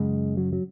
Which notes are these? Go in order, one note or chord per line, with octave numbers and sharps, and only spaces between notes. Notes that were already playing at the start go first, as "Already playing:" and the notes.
Already playing: F#2 C#3 G#3
F#3
F#3